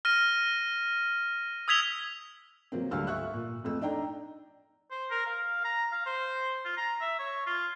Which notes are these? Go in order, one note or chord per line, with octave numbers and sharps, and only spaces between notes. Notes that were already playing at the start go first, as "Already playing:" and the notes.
F6 A#6 D#7
D#6 E6 G#6 B6 F7 G7
C3 F#3 A#3 C4
D2 D3 G3 F5 E6 F6
E5 C#6 E6 F#6
A#2
F2 A3 E6
D4 D#4 G5 A#5
C5
A#4
F5
A#5
F5
C5
F4
A#5
E5
C#5
F4